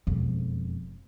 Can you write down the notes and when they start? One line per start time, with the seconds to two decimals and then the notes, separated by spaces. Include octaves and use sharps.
0.07 E1 F2